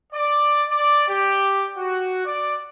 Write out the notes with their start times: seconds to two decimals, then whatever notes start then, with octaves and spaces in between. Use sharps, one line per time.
0.13 D5
0.69 D5
1.08 G4
1.78 F#4
2.25 D5